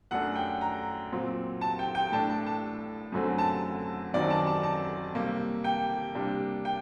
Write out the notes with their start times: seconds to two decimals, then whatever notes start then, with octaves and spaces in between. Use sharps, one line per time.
0.11 F#2 F#3 A3 D4 F#5
0.35 G5
0.61 A#5
1.12 A#2 F#3 C4
1.61 A5
1.79 G5
1.95 G5
2.12 A2 A3 D4 A5
2.29 A5
2.46 A5
3.12 F#2 D3 F#3 A3 C4
3.38 A5
4.13 F#2 D#3 F#3 C4 D5
4.30 A5
4.47 A5
4.63 A5
5.15 C3 G3 A#3
5.64 G5
6.15 C3 G3 A#3 D4
6.65 G5